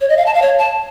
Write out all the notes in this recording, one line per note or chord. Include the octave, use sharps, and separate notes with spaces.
C#5
D#5
F5
A5
F5
C#5
A5